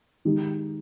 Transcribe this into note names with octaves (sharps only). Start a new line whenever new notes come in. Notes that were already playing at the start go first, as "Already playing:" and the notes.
D#3 G#3 D#4 G4